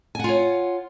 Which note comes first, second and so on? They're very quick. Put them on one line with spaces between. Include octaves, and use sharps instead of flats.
G#5 F#5 F4 C#5